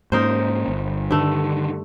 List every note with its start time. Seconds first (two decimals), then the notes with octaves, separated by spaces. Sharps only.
0.12 G#2 A#3 C#4 D#4 A#4 C5
0.68 G1
1.11 G2 D3 D#3 A3